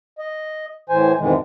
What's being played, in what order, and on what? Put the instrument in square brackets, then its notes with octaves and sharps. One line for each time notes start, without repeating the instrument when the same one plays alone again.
[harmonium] D#5
A2 E3 C5 G#5
F2 G#2 B2 D#3 E3 G#3